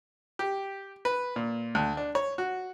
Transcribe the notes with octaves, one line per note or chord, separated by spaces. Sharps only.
G4
B4
A#2
D2
D4
C#5
F#4